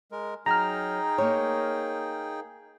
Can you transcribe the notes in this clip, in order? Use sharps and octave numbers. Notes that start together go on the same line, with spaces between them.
G#3 A#4
F#3 D#4 G#4 G5 A#5 F6
A#3 C#5